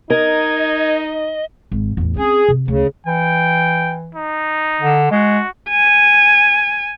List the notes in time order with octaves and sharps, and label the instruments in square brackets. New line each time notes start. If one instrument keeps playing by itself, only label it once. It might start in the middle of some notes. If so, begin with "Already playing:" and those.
[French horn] D#4 [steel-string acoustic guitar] A#4 [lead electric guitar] D#5 [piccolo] G#6
[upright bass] G#1
A1 E2
[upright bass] C4 C#4 [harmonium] G#4
[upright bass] C3
[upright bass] D2 [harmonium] C#3
[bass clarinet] E3 [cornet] G5
[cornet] D#4
[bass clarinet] D3
[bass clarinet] G#3 [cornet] F#4
[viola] G#5